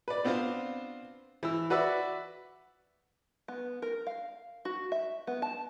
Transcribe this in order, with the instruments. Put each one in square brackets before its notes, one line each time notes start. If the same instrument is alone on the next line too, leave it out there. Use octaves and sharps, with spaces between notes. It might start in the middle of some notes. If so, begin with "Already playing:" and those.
[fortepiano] B4 D5
B3 C4 D4 F4 C5
E3 E6
F#4 B4 D5 E5 E6
[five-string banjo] B3
A#4
F5
F#4
E5
B3
A5